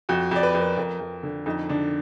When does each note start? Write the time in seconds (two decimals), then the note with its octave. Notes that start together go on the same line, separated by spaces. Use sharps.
0.09 F2 F#4
0.31 F2 D5
0.43 B4
0.54 F2
0.60 A#4
0.77 F2 A#4
1.00 F2
1.23 D3
1.46 F2 D#4
1.69 D3 D4